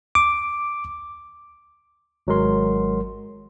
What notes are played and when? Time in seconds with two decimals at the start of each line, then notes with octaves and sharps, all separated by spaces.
0.15 D6
2.27 G#1 F#3 G#3 A#4 C6